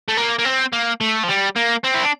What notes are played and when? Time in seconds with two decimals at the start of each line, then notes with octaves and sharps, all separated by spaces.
0.09 A3
0.17 A#3
0.39 A#3
0.45 C4
0.73 A#3
1.01 A3
1.23 F3
1.28 G3
1.56 A#3
1.84 C4
1.94 E4
2.03 D4